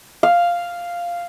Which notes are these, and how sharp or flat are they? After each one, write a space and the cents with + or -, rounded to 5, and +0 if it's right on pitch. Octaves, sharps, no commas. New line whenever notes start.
F5 -5